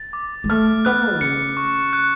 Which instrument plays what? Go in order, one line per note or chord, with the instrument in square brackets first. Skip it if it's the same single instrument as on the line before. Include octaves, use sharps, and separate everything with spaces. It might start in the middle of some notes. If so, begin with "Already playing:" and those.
Already playing: [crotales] A6
D6
[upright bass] G#3
[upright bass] A3 [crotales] F6
[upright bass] B3 [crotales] F#6
[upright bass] D3
[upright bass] C#3 [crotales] C#7
[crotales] C#6
F#6